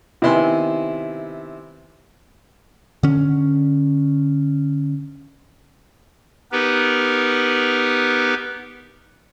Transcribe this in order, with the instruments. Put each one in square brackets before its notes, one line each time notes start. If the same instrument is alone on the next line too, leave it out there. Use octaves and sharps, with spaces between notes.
[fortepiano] C3 D#3 B3 E4 G#5 C6
[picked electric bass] D3 C#4
[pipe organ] B3 D#4 G4 A#4 B4